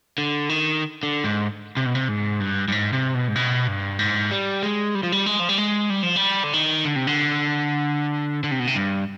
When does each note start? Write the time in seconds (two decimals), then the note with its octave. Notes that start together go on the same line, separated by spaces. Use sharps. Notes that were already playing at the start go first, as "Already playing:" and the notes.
0.18 D3
0.49 D#3
1.03 D3
1.24 G#2
1.77 C3
1.86 B2
1.95 C3
2.08 G#2
2.40 G2
2.68 G2
2.72 G#2
2.93 C3
3.15 B2
3.28 G#2
3.36 B2
3.67 G2
3.99 G#2
4.31 G3
4.63 G#3
4.95 G3
5.03 F3
5.12 G3
5.26 G#3
5.39 F3
5.49 G3
5.58 G#3
5.90 G3
6.03 F3
6.16 G3
6.44 D3
6.53 D#3
6.85 D3
6.96 C3
7.07 D3
8.44 D3
8.51 C3
8.60 B2
8.67 C3
8.75 G2